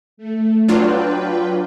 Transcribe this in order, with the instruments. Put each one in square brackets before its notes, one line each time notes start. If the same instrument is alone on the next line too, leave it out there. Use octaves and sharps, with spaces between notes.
[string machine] A3
[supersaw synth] F#3 D4 F4 [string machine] B4 G5